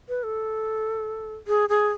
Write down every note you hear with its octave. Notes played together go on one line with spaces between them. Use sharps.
B4
A4
G#4
G#4